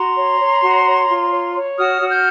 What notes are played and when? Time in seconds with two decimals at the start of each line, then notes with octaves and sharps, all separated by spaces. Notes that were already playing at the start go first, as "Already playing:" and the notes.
Already playing: F#4 A#5 C6
0.16 C#5
0.39 C#5
0.62 F#4
0.85 C#5
1.09 F4
1.32 C#5
1.55 C#5
1.77 F#4 D#6 F6
2.00 F#4
2.08 F6 G6